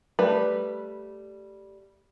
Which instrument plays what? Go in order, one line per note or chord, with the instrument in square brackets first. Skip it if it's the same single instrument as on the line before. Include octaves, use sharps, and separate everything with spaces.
[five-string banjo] G3 A3 B4